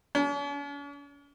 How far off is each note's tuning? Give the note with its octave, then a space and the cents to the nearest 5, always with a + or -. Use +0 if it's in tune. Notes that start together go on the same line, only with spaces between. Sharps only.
C#4 +45